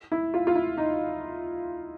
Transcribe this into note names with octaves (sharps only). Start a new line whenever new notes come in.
E4
F4
F4
E4
D#4